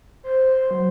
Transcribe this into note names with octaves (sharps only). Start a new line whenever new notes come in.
C5
F#3